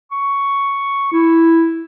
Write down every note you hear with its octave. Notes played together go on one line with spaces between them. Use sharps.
C#6
E4